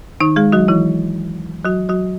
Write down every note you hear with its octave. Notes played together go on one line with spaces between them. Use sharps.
D#3 D#4
G#3 G#4
F#3 F#4
E3 E4
F#3 F#4
F#3 F#4